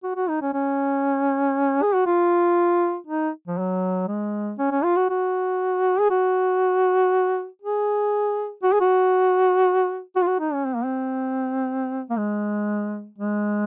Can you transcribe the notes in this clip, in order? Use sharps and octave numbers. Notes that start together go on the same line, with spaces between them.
F#4
F#4
D#4
C#4
C#4
G#4
F#4
F4
D#4
F3
F#3
G#3
C#4
C#4
F4
F#4
F#4
G#4
F#4
G#4
F#4
G#4
F#4
F#4
F4
F#4
D#4
C#4
C4
A#3
C4
A#3
G#3
G#3